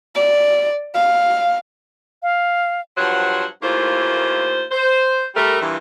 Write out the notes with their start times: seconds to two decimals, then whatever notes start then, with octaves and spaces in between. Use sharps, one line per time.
0.15 D5
0.95 F5
2.23 F5
2.97 G2 F3 F#3 C5 C#5 F#5
3.62 D#2 A2 E3 A#3 F4 C5
4.72 C5
5.35 G3 A3 A#4
5.61 G2 A#2 E3